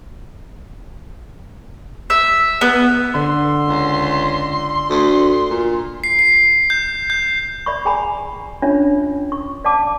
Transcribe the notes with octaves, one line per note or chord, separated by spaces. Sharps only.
E5
B3
D3 C6
C#2
D2
A#2
C7
C7
G6
G6
D5 E5 B5 C#6
G#4 G5 G#5 A#5 B5
C#4 D4 F4 C#5 E5
C#6
D5 F5 G5 A5 D6